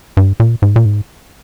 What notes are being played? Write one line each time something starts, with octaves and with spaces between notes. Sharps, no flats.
G2
A#2
G#2
A#2
G#2